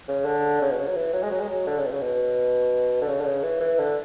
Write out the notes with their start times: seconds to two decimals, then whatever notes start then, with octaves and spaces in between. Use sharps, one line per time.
0.08 C#3
0.25 D3
0.61 C#3
0.70 B2
0.78 C#3
0.87 F#3
0.96 E3
1.13 F#3
1.23 G#3
1.30 F#3
1.40 G#3
1.48 F#3
1.67 D3
1.78 C#3
1.85 B2
1.90 C#3
2.01 B2
3.01 D3
3.08 C#3
3.20 D3
3.25 C#3
3.43 E3
3.61 E3
3.78 D3